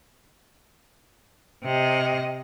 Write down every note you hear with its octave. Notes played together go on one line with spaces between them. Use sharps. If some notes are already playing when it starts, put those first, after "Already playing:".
C3 D#5